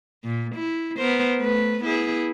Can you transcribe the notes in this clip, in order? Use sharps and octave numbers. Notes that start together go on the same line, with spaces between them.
A#2
E4
B3 A#4 C5
A3 B4
B3 E4 G#4